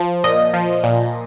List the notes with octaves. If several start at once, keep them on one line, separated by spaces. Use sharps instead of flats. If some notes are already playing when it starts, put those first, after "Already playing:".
Already playing: F3
A#2 D#5
F3
A#2